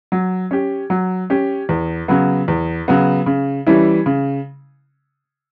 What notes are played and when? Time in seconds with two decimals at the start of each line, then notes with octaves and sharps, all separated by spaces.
0.12 F#3
0.51 C#4 G4
0.90 F#3
1.30 C#4 G4
1.69 E2
2.08 C#3 F#3 B3
2.48 E2
2.88 C#3 F#3 B3
3.26 C#3
3.67 E3 G3 C#4 E4
4.06 C#3